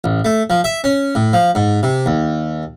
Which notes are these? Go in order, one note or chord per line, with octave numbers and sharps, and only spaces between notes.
A1
A3
F3
E5
C#4
A2
F3
G#2
C3
D#2